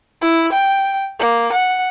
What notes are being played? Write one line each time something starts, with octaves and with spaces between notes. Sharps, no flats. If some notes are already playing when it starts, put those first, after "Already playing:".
E4
G5
A#3
F#5